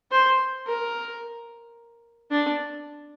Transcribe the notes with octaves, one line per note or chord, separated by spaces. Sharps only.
C5
A#4
D4